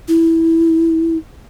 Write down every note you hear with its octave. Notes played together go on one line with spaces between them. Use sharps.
E4